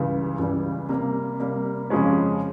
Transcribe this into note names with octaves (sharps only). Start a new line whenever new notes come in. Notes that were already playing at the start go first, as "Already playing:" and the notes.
Already playing: C#2 C#3 E3 G3
C#2 C#3 E3 G3
C3 G3 A#3
C3 G3 A#3
F2 C#3 F3 G#3 C#4